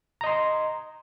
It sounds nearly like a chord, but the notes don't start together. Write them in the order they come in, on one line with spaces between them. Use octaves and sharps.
A#5 D#5 C6